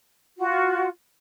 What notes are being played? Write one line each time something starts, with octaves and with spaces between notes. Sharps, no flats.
F4 F#4